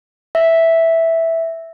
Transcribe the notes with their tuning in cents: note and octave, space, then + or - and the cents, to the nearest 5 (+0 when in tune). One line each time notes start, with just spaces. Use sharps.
E5 -5